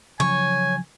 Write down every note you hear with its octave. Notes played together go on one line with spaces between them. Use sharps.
C#3 F3 F#3 C#5 G#5